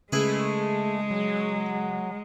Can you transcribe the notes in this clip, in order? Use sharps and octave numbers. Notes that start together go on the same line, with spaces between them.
C#3 G#3 A3 E4 G#4 B4
F#3